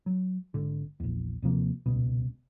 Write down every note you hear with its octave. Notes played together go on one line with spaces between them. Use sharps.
F#3
G#1 D3
A#1 E2
D#2 C3 F3 A#3
D#1 C#2 B2